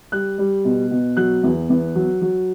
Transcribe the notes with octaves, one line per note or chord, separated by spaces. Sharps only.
G3 F#6
G3
B2
B2
F#3 F#6
E2
E2
F#3
F#3